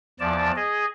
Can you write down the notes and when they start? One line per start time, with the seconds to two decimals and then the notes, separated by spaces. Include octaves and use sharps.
0.20 E2 F3 D5 A5
0.56 G#4 D#5